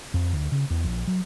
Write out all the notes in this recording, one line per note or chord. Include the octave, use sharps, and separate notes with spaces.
F2
D2
C#3
E2
A#1
F#3